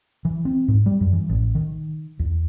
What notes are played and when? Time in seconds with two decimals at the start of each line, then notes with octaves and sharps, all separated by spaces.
0.25 E3
0.45 C4
0.68 G#2
0.86 G3
1.01 F#2
1.13 E3
1.30 A1
1.55 D#3
2.19 E2